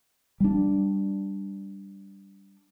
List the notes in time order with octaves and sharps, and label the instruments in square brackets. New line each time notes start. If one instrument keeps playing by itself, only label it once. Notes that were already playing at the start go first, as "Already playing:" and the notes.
[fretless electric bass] G3 D4